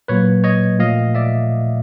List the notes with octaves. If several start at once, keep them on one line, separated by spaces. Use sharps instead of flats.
A#2 F#3 A#3 B4 C#5
C#5 D#5
A#2 F3 A3 D#5 F5
D5 E5